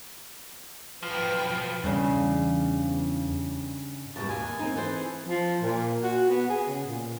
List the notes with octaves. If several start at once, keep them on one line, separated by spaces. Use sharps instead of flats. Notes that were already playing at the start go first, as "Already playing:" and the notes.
B1 F3 B4 G5 F6
E2 G2 C#3
F#2 B2 G3 A5
D#2 G#5
C4 D#4
E3 A4 C5
G#4
F3
A#2
F#4
B3
G#4
C#3
A#2